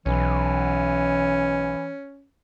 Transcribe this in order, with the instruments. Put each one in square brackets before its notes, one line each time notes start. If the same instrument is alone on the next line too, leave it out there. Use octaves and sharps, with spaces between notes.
[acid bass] B1 [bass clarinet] E3 [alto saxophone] C#4